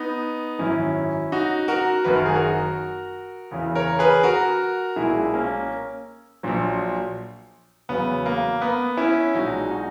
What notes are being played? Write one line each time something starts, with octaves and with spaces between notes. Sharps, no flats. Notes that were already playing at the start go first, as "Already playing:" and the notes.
Already playing: B3 D#4
G#1 F#2 D#3 F#3 C#4 E4
D#4 F#4
F#4 A#4
F#1 F#2 D#3 B4
A#4
G#4
F#4 A#4
E2 C#3 E3
A#4 C#5
G#4 B4
F#4 A#4
B1 A#2 G#3 E4 G#4
A#3 C#4
A#1 A#2 F#3
E2 C#3 F#3 B3
A#3
B3
C#4 E4
B1 A#2 G#3 D#4 F#4
D#4 F#4